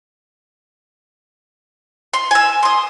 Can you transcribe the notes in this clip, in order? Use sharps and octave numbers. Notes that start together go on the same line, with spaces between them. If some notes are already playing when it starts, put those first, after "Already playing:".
C6
G#5 E6
C6 D#6